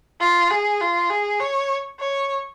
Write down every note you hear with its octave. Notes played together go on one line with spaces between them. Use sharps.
F4
G#4
F4
G#4
C#5
C#5